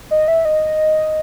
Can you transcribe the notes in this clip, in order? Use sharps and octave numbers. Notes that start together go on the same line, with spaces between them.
D#5
E5
D#5